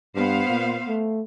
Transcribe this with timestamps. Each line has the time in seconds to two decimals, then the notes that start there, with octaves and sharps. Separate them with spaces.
0.15 G2 B3 C5 F5
0.48 A#2
0.88 A3